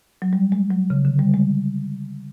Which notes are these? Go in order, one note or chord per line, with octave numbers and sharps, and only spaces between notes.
F#3
G3
G#3
F#3
C#3
D3
G3
G#3